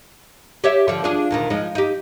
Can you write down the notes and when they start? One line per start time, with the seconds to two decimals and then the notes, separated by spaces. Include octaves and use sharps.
0.64 G4 C#5 E5
0.88 D3 F3
1.04 D4 F4 G#4
1.31 D2 A#2 D#3
1.50 F3 G#3 D#4
1.75 D#4 G4